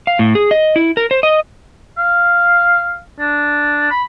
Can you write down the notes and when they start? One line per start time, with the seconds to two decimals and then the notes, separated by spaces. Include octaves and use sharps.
0.07 F5
0.19 A2
0.35 G#4
0.51 D#5
0.76 E4
0.97 A#4
1.11 C5
1.23 D#5
1.98 F5
3.19 D4
3.91 B5